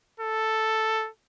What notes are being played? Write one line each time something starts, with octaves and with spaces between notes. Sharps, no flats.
A4